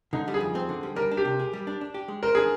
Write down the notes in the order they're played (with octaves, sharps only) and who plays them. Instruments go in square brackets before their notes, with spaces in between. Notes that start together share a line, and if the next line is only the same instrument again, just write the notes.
[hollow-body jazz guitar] D3 [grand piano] D#4
[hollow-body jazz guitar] G3
[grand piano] G#4
[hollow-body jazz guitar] F2
C4
D3
G3
[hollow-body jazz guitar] G3 [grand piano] A#4
[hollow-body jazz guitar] D4
[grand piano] G4
[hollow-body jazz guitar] C3
G#4
G3
D4
D4
G4
G#3
[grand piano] A#4 [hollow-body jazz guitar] C5
[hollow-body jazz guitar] D4 [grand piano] G#4